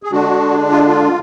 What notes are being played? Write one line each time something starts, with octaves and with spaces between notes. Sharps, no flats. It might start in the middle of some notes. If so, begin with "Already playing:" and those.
G#4
D3 G#3 D4 F#4
F4
F4